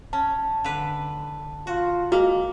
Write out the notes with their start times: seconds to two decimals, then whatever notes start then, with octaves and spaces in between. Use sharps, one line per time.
0.13 C#4 A5
0.64 D3 B4
1.67 F4 F#4
2.12 G#3 A#3 F#4